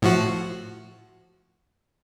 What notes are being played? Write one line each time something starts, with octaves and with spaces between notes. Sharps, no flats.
A2 F3 F#4